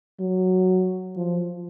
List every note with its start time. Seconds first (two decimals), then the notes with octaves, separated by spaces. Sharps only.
0.20 F#3
1.17 F3